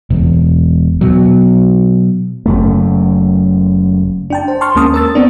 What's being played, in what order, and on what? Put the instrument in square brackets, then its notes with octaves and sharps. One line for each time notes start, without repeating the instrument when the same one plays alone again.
[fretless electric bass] E1
B2 F#3
[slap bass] F#1 F#2 A3
[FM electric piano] D4 G5 A5
C5
A5 C6 C#6 F6
D#2 G#3 A#3 C#4 A5 D#6
A#4 E6 A6
B3 C4 D4